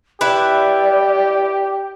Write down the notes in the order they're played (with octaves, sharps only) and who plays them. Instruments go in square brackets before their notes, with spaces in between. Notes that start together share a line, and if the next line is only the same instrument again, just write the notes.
[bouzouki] E4 B4 [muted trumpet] G4 [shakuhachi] D5